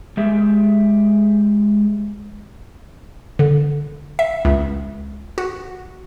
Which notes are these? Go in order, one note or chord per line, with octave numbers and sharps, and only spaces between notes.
G#3 G4 E5
D3
E5
C#2
F#4